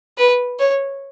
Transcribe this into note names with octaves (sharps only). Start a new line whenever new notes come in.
B4
C#5